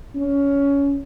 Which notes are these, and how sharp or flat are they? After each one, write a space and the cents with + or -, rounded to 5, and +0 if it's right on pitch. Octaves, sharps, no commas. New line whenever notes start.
C#4 +15